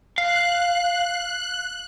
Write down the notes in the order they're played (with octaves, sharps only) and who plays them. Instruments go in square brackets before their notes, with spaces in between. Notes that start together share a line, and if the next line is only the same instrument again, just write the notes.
[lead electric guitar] F5 [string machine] F#6